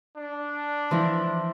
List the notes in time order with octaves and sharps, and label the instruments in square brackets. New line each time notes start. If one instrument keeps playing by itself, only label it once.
[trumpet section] D4
[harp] E3 F3 E4